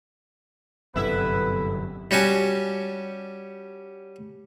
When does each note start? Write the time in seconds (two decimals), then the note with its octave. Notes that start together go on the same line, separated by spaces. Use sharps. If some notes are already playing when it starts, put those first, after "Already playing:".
0.96 G1 F#2 C3 B3 E4 A4 B4 E5
2.11 G3 C#4 F#4 G#5 A5